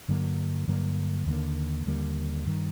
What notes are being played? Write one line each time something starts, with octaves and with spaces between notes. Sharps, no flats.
G2 D3 F#3 A#3
G2 D3 F#3 A#3
D#2 D3 G3 A#3
D#2 D3 G3 A#3
G2 D#3 G3